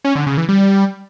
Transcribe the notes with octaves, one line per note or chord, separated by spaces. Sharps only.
C#4
D3
C#3
E3
G3